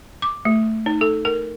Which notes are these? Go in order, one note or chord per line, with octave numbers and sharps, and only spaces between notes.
D6
A3
D#4
A4
A#4